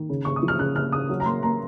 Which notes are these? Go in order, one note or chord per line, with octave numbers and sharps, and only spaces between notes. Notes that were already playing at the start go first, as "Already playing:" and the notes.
Already playing: D#3
C#3
C#3 C#6
D#6
F3
F6
C#3 F#6
C#3 F6
C#3 D#6
F#3
A#5
A#3 C6
A#3 A#5